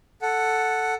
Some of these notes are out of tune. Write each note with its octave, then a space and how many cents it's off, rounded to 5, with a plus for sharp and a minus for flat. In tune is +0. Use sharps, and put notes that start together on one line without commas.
A4 +0 F#5 +0